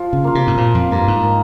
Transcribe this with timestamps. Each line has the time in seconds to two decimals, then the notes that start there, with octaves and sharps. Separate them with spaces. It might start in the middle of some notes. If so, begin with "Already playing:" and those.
Already playing: F3 F4
0.13 C#3
0.24 A#3 F4
0.35 C3
0.47 G#2
0.57 A#2 F3
0.75 F2
0.91 G2 A#3 F4
1.08 G#2
1.24 D#3